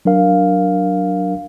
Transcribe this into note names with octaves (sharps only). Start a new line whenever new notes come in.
F#3 D4 A#4 F5